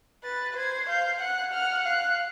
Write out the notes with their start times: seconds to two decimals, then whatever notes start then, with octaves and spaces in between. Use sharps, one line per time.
0.24 B4 A6
0.57 C5 G#6
0.89 F5 G6
1.21 F#5 F#6
1.53 F#5 F6
1.85 F5 F#6